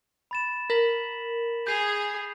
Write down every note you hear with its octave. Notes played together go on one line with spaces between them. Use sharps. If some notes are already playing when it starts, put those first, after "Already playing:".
B5 A6 E7
A#4 A#6 B6 F#7
G#4 G6 C7 F7